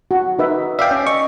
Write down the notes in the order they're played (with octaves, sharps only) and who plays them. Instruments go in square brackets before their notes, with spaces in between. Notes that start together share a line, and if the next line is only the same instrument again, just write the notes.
[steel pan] F#4
D#4 B4 E5
[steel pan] D5 [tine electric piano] E5 F5 G5
[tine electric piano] C#4
[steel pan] D#5 [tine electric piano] C#6